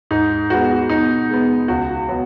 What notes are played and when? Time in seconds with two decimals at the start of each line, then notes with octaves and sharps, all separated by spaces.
0.11 G#2 D#4
0.50 G#3 B3 F#4
0.89 B2 D#4
1.29 G#3 B3
1.68 C#2 F#4
2.08 B2 F#3 B3